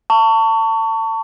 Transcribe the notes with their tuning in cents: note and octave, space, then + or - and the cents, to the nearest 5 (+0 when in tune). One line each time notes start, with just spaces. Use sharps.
A5 +30 C#6 +20